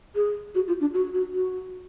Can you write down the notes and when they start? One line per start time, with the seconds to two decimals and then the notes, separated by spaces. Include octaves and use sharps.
0.15 G#4
0.55 F#4
0.67 F4
0.80 D4
0.94 F#4
1.14 F#4
1.34 F#4